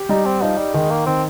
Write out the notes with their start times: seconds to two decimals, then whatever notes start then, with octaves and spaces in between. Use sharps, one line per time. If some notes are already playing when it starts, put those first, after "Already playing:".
Already playing: G4
0.09 G3 D#4
0.25 C4
0.42 F3 D#4
0.58 G3
0.74 D#3 G#3
0.91 A#3
1.06 D#3 C4